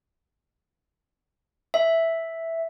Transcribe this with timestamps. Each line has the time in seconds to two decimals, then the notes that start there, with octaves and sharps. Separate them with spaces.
1.74 E5